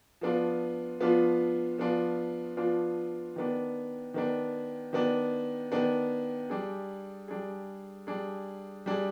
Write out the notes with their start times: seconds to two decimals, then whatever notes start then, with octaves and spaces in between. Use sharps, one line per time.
0.21 F3 B3 D4 F4
1.00 F3 B3 D4 F4
1.78 F3 B3 D4 F4
2.57 F3 B3 D4 F4
3.36 D#3 B3 D4
4.14 D#3 B3 D4
4.93 D#3 B3 D4
5.72 D#3 B3 D4
6.50 G3 D4 G#4
7.28 G3 D4 G#4
8.07 G3 D4 G#4
8.86 G3 D4 G#4